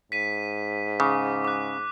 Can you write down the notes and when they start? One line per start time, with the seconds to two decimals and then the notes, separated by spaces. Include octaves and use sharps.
0.12 G#2 B6 D#7
1.00 C#3 D6
1.45 D6 F#6